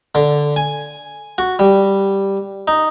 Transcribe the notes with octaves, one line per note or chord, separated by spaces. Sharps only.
D3
G#5
F#4
G3
D#4